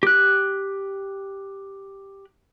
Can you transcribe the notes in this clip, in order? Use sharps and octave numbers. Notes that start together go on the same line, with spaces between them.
G4 F#6